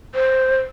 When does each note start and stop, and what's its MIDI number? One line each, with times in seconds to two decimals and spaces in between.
0.15 0.60 72